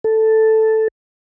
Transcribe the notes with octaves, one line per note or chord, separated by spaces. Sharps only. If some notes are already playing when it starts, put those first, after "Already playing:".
A4